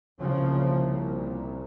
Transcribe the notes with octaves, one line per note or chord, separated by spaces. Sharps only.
C2 A#2 C#3 F3